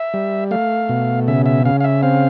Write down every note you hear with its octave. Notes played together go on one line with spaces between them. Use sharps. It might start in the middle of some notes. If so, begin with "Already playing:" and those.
Already playing: E5
G3
A3 F5
B2
C#3 E5
E5
C#3 F5
F5
E5
C4 F5